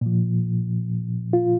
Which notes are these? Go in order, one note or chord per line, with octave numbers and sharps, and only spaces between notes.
A#2 F3
F4